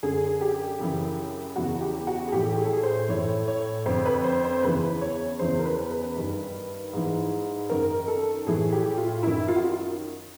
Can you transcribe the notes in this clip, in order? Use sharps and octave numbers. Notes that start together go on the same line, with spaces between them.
F#2 D3 G#4
G4
F#2 C#3 E3
E2 C#3 E3 F#4
G4
F#4
G#4
A2 E3 G4
G#4
A4
G#4
C5
A2 E3 C#5
C#5
F2 D3 C5
B4
C5
C5
E2 C#3 E3 B4
C#5
E2 C#3 E3 C5
A#4
B4
B4
G2 D#3
G#2 E3
F#2 D#3 A#4
A4
A2 E3 G#4
G4
F4
F#2 D#3 E4
F4
F#4
F4